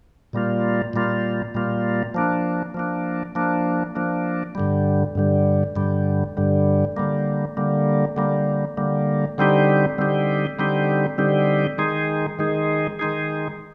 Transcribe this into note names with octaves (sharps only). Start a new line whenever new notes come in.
A#2 G3 A#3 F4
A#2 G3 A#3 F4
A#2 G3 A#3 F4
F3 A#3 D4
F3 A#3 D4
F3 A#3 D4
F3 A#3 D4
G2 D3 G3
G2 D3 G3
G2 D3 G3
G2 D3 G3
D3 G3 A#3
D3 G3 A#3
D3 G3 A#3
D3 G3 A#3
D3 G3 C4 D#4 G4
D3 G3 C4 D#4 G4
D3 G3 C4 D#4 G4
D3 G3 C4 D#4 G4
D#3 G#3 D#4 G#4
D#3 G#3 D#4 G#4
D#3 G#3 D#4 G#4